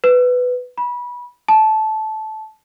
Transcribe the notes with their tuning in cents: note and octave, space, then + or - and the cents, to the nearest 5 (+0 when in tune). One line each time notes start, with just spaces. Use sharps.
B4 +10
B5 -25
A5 -15